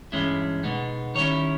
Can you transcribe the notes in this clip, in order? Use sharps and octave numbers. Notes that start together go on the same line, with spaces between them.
G2 E3 G#3 C#4 E4
B2 G#3 B3 D#4
D#3 G3 C#4 E4 C#5